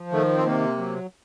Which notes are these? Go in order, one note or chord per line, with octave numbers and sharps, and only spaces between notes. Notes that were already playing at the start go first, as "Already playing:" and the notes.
Already playing: F3
D#3 A3
C4
C3 A#3
F#3